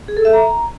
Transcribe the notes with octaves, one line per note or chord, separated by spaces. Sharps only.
G#4
A4
E5
A#5